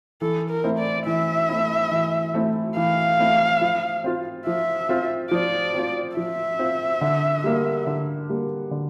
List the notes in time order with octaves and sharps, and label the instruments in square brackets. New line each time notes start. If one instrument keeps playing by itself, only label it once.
[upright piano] E3 [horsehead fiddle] A4
[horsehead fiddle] A#4
[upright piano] A3 C4 E4
[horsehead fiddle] D5
[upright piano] E3 [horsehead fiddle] E5
[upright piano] A3 C4 E4
E3
A3 C4 E4
[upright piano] E3 [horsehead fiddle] F5
[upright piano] A3 C4 E4
F3
C4 F4
[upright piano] F3 [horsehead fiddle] E5
[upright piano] C4 F4
[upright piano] F3 [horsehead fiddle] D5
[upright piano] C4 F4
[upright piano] F3 [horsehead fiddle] E5
[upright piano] C4 F4
D3
G3 A#3
D3
G3 A#3
D3